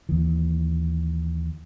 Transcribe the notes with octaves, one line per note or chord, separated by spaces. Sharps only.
D#2 E3